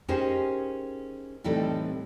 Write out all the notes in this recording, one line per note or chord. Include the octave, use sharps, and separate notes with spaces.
C#4 D#4 G4 G#4 A#4 C5
A2 C3 E3 G3 D#4 A4